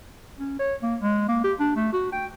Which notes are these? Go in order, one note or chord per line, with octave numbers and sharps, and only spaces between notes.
C#4
C#5
A#3
G#3
A#3
G4
D4
A3
F#4
G5